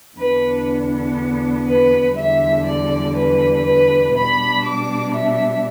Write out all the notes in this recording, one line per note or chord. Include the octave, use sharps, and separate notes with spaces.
E2 D3 B3 D4 B4
B4
E2 D3 G3 E5
D5
B4
B4
B2 G3 D4 B5
D6
E5